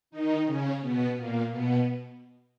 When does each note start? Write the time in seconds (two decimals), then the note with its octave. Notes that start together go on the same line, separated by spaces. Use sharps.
0.11 D#3 D#4
0.46 C#3 C#4
0.81 B2 B3
1.16 A#2 A#3
1.51 B2 B3